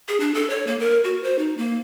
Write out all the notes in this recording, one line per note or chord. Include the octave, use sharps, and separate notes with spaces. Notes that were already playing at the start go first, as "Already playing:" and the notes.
G#4
D4
A4
C#5
A#3
A#4
F#4
C5
D#4
A#3